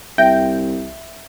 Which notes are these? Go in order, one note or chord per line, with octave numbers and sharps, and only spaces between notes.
C2 E5 G5